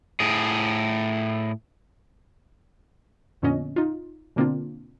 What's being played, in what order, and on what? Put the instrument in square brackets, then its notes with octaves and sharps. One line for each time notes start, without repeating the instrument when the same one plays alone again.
[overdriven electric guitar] A2 G#4
[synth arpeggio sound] F2 A#2 D3 B3 C#4 D#5
D#4 F4
B2 D3 A#3 C4 D4 F4